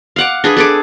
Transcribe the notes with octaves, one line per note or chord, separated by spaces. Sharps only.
F5 F#5 D6
D4 G#4 B4
G#4 A4 D6